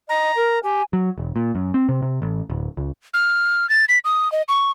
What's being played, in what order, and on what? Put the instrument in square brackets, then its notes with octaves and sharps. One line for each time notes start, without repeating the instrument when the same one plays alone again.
[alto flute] D#5 [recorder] A#5
[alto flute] A#4
[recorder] G4 [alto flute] G#5
[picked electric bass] F#3
E1
A#2
F#2
C4
C3
C3
A1
D1
C#2
[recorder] F6
A6
B6
D#6
D#5
C#6